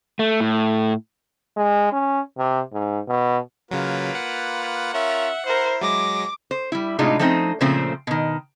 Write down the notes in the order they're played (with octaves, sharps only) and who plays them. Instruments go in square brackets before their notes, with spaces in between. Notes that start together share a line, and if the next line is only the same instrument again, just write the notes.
[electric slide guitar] A3
A2
[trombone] G#3
C#4
C3
G#2
B2
[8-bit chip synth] C#3 F#3 [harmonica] A#3 F4 B4
[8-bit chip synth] F#5
[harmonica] C#4 F4 A#4 [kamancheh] E5
[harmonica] E4 [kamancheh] A#4 C5
[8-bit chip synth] F#3 G#3 A#6 [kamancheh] D6
[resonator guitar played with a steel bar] C5
G3 E4
A2 C3 G#3 D4 D#4 F4
F3 A3 C4 C#4 D#4
A#2 C#3 F3 A3 C4 C5
B2 D#3